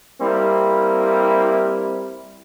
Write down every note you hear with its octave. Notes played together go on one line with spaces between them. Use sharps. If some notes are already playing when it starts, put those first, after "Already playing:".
G3 A#3 C4 E4